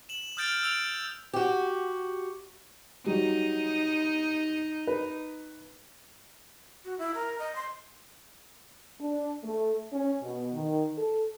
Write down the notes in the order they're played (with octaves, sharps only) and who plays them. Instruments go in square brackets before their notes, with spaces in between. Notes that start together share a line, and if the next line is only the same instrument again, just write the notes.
[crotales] E7 F#7
D#6 F6 G6 A6 D7
E6 D7 F7
[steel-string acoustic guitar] F#4 G4
[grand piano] F#3 G3 [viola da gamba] D#4
[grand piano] B4
[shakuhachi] F#4
E4
A#4
D#5
C6
[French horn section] D4
A3
C#4
B2
D#3
A4